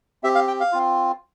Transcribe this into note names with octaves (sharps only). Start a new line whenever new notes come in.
C4 G4 E5
F5
G5
F5
C4 F4